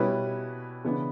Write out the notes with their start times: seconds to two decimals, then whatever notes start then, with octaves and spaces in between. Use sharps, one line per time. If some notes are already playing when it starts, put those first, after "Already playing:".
Already playing: B2 G3 C#4 E4 B4
0.84 C#3 E3 B3 D4